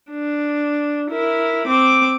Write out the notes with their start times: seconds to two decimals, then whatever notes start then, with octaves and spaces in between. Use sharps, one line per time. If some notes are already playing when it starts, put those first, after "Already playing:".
0.11 D4
1.10 E4 A#4
1.67 C4 D6